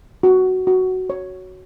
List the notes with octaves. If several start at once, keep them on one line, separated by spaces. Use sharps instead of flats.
F#4
F#4
C#5